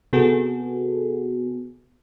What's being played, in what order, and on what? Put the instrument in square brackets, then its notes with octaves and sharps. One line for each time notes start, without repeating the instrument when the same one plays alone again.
[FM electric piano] C3 B3 F#4 G#4 A4